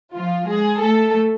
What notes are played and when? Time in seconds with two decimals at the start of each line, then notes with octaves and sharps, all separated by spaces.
0.15 F3 F4
0.48 G#3 G#4
0.80 A3 A4